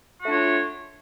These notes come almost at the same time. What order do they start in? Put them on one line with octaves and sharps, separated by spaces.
F#4 A3 D4 F4 C#5